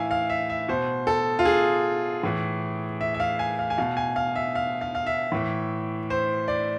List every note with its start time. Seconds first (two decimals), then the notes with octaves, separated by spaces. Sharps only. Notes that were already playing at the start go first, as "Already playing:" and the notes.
Already playing: A2 E3 E4 E5 F5 G#5
0.11 F5
0.30 E5
0.50 E5
0.68 B2 C5
1.07 A4
1.39 F4
1.45 G#4
2.23 A2 E3
3.01 E5
3.14 E5
3.20 F5
3.39 G#5
3.59 F5
3.70 G#5
3.78 B2 F5
3.97 G#5
4.16 F5
4.36 E5
4.55 F5
4.81 F5
4.95 F5
5.06 E5
5.32 A2 E3
6.10 C5
6.48 D5